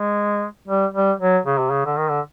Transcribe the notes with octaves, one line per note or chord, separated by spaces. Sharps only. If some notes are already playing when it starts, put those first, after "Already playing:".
Already playing: G#3
G3
G3
F#3
C#3
C3
C#3
D3
D#3
D3